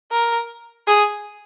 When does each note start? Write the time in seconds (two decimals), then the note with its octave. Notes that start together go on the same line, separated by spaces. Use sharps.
0.12 A#4
0.87 G#4